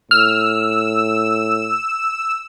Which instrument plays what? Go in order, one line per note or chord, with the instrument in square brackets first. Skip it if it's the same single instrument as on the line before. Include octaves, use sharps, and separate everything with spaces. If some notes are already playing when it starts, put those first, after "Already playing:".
[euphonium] A2 [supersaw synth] E6 [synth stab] F6